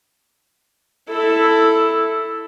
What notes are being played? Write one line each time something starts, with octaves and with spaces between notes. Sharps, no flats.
E4 A4